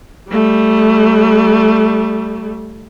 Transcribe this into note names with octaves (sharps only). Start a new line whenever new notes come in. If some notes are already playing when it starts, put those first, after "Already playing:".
G3 A3